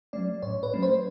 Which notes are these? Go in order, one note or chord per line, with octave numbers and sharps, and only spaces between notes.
F#3 A3 C#4 D5
A2 C#5
B4
F#3 A3 C#4
C5